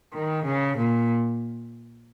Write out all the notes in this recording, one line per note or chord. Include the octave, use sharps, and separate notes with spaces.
D#3
C#3
A#2